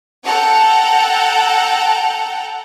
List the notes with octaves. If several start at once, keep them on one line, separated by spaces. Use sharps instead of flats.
A4 F#5 G5 A5 A#5